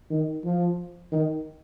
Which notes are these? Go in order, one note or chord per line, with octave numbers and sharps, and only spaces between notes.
D#3
F3
D#3